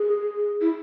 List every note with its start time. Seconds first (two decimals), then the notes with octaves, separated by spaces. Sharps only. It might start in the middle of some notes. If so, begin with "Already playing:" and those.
Already playing: G#4
0.61 E4